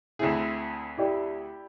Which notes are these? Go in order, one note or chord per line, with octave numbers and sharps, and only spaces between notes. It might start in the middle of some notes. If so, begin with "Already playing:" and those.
D2 C4 E4 G#4 E7
E4 G4 D5